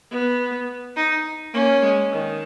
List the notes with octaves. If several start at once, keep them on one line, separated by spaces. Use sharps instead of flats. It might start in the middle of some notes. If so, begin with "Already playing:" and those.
B3
D#4
A#3 C#4
G#3
D#3